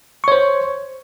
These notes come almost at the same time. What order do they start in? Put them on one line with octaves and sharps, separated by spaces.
C#6 C#5 C5